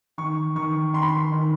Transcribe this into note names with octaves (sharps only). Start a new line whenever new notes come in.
D#3 C#6
D#3 C#6
D#3 C6
B5
C6
D#3